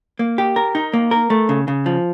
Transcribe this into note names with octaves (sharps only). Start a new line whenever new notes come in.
A#3
G4
A#4
D#4
A#3
A#4
A3
C#3
C#3
F3